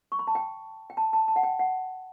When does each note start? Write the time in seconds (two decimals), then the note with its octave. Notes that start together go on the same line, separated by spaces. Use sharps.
0.12 C#6
0.19 B5
0.27 A5
0.35 G5
0.90 G5
0.97 A5
1.13 A5
1.28 A5
1.36 F#5
1.43 G5
1.59 F#5